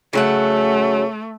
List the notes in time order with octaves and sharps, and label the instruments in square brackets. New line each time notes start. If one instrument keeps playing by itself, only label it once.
[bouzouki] C#3 F#3 F#5 [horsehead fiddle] A3